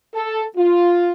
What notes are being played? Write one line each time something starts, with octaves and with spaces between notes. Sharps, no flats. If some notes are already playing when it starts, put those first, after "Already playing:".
A4
F4